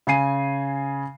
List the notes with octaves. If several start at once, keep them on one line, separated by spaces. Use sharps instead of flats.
C#3 G#5 C7 D#7